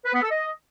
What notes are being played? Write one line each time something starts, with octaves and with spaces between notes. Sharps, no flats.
B4
B3
A4
D#5